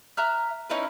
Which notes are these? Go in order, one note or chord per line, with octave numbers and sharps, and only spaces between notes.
E5 A#5 F6 F#6
C#4 D#4 E4 B4